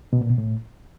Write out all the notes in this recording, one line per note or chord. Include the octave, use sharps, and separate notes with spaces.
B2
A#2
B2
A2